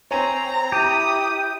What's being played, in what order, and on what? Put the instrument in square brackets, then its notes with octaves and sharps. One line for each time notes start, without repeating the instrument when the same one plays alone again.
[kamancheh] C4 [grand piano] C#5 G#5 D#7 [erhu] A#5
[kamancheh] E4 D#6 [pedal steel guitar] G4